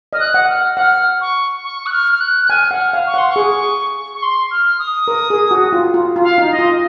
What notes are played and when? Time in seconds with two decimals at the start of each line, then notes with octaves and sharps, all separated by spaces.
0.13 D#5 F6
0.20 F#6
0.34 F#5
0.49 F6
0.77 F#5 F6
1.21 C#6
1.64 C#6
1.86 F#6
1.92 F6
2.13 F6
2.20 F#6
2.45 F#6
2.50 G#5 F6
2.71 F#5
2.79 F6
2.93 F5
3.07 C#6
3.14 F#5 C6
3.30 C#6
3.36 G#4
4.15 C#6
4.22 C6
4.51 F6
4.79 D#6
5.08 A#4
5.30 G#4
5.51 F#4
5.73 F4
5.94 F4
6.16 F4
6.23 F5
6.38 D#4
6.51 D#5
6.59 F4